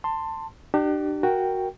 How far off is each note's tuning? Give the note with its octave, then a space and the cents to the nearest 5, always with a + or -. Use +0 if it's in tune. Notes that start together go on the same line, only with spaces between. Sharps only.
A5 +20 C6 +0
D4 +35 G4 -25
F#4 +0 A#4 +0 G5 +0